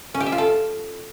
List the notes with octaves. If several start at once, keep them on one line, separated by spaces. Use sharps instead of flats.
C#4
G4
E5
F4
A4